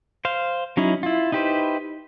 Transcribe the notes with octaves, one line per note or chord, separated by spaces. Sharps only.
C5 F5
F#3 C#4 D#4 E4
E4 F4
D#4 E4 G4 B4 C5